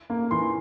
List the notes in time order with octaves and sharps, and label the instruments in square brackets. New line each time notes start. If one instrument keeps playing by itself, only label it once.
[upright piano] A#3
E3 C6